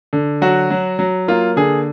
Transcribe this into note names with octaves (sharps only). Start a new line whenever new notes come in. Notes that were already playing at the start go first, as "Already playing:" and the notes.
D3
F#3 F#4
F#3
F#3
A#3 F4
D3 G#4